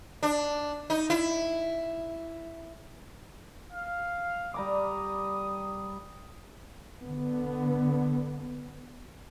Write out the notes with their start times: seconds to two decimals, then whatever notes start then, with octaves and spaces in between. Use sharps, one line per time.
0.23 D4
0.90 D#4
1.10 E4
3.73 F5
4.54 G3 A#5 D6 D#6
7.02 D3 B3